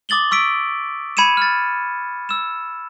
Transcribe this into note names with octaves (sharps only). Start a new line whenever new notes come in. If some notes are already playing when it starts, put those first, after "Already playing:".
D6 D#6 A6 F#7 G7
C#6 E6 B6 D7
B5 G#6 C#7 D#7 E7
F6 A6
E6 E7